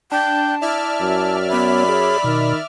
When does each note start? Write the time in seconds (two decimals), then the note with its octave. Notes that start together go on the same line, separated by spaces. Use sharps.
0.12 D4 G5 A5
0.62 E4 D5 E5 F6
1.01 F#2
1.49 B3 C#5 B5
1.89 G#4 C#5
2.24 B2 D#3